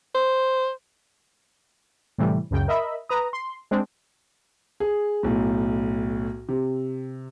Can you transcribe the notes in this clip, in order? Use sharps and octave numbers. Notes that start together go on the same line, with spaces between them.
C5
A2 C3 E3 G3
C#2 F#2 C#3 G5
A#4 D#5 E5 B5
B4 A#5 D#6
C6
G#3 C4 D4
G#4
B1 A2
C3